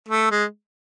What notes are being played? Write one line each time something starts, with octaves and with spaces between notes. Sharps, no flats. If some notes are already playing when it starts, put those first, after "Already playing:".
A3
G#3